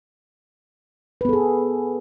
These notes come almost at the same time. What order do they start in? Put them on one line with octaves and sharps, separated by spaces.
B4 B3 A4 G#4